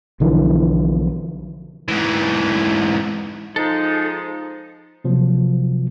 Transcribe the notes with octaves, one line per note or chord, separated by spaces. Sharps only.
B1 D3 E3 F3
G#2 E3
F3 G#3 D#4 A4
C3 F3 F#3 A#3